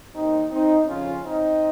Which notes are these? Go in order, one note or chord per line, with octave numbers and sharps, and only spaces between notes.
D#2 D#3 C4 D#4
C4 D#4
F2 C#3 F3 C#4 F4
C4 D#4